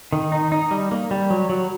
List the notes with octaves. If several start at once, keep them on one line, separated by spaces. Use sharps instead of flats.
D#3
D#4
D#4
G3
A#3
G3
F#3
F#3